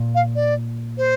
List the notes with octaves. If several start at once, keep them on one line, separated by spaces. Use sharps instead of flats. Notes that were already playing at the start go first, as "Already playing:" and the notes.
Already playing: A#2
F5
D5
C5